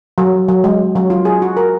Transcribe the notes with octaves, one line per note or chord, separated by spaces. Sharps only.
F#3
F#3
G#3
F#3
F4
G#4
F#4
A#4